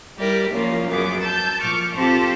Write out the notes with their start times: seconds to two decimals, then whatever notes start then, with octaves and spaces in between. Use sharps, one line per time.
0.18 G3 E4 G4 A#4 D5
0.50 A#2 C#3 F3 A#3 F4
0.89 F#2 B3 G#4 D6
1.20 A5 E6 G6
1.61 A#2 F3 C#6 D6 F6
1.94 C4 F4 G4 A4 C5